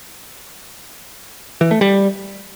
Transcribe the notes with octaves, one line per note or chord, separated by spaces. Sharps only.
E3
A3
G3